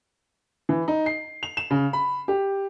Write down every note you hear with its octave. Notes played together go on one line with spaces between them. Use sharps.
E3
D#4
C7
F7
E7
C#3
B5
G4